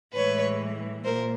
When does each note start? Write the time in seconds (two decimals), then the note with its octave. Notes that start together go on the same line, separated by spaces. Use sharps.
0.15 A2 E3 G#3 B4 C#5
1.04 A#2 A#4 C5